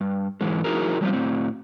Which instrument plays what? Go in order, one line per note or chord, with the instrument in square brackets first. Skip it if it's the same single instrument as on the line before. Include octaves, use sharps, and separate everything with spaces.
[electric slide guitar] G2
G#2 E3 G#3
F3 D#4 E4 F#4 G#4 A#4
F3 G3 A#3 C4 F4
A2 C4